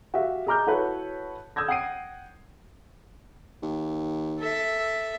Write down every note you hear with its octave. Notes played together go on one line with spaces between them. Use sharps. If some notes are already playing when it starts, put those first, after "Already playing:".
F#4 G4 E5 F5
G#4 D#5 A#5 D6 F6 G6
E4 F#4 A4 B4 C#5
D#6 E6 G6 G#6 A#6
F#5 G5 D#6 C7 D7 D#7
D#2
A4 E5